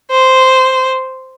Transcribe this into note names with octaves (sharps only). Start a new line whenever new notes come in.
C5